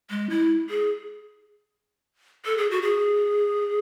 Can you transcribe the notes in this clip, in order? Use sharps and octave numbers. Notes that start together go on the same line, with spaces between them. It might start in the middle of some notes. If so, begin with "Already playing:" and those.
G#3
E4
G#4
A4
G#4
F#4
G#4